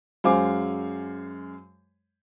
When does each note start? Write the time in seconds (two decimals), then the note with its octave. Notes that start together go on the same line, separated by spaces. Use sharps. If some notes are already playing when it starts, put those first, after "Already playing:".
0.24 F#2 G#3 C5 F5 G#5 D6